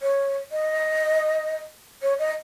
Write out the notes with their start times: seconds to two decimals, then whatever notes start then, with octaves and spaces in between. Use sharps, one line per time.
0.02 C#5
0.52 D#5
2.02 C#5
2.19 D#5